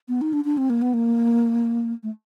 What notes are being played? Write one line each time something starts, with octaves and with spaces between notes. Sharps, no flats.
B3
D#4
D4
D4
C4
A#3
B3
A#3
A3